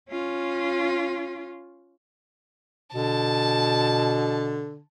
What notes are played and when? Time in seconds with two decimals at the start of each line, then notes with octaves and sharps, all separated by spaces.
0.10 C#4 F4
2.94 B2 D3 A5